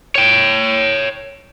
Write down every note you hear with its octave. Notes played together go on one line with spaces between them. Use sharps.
C#5 G5